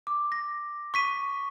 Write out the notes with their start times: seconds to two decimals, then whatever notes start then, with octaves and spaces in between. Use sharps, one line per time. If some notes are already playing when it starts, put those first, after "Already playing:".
0.07 D6
0.32 A#6
0.94 C#6 B6 D#7